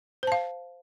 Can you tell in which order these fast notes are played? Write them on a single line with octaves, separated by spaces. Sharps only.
C5 A5 F5